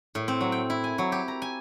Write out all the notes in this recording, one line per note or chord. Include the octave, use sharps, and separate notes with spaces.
A2
C4
F#3
G5
E4
G#5
F#3
G4
A#5
G#5